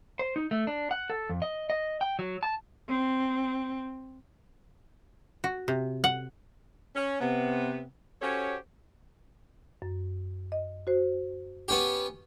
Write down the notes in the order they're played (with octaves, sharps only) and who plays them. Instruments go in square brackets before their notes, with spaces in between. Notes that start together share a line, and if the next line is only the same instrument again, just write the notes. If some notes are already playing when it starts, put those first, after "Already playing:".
[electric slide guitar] C5
D#4
A3
D4
F#5
A4
F2
D#5
D#5
G5
F#3
A5
[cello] C4
[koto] F#4
C3
F#5
[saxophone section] C#4
C3 B3
C#4 F#4 G4 A4 C5 C#5
[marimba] F#2
D#5
F#4 C5
[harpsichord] B3 C#4 G4